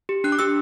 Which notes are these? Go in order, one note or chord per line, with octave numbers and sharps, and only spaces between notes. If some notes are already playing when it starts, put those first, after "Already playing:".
G4
D4 F#6
D6
G4 E6